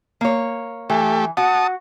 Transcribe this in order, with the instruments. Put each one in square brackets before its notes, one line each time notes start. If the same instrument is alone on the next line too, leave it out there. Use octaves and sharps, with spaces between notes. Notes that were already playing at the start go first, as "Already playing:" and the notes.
[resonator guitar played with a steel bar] A#3 C#5
[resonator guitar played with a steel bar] E3 [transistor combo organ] A3 G4
[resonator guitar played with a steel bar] F#4 F#5 [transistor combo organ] A5 D#6